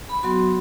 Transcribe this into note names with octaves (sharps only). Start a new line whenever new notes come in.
B5
F#3 B3 F#4 C6